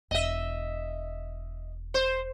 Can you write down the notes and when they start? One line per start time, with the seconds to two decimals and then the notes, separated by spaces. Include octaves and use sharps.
0.11 E1 D#5 E5
1.94 C5